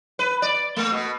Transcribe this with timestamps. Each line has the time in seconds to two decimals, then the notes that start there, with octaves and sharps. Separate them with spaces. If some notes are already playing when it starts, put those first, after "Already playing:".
0.19 B4
0.42 D5
0.76 A3
0.92 B2